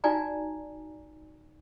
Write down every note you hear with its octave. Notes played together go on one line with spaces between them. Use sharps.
D#4 F4 F#4 D5 G#5 A#5